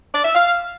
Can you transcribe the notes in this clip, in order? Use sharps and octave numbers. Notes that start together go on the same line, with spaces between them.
D5
E5
F5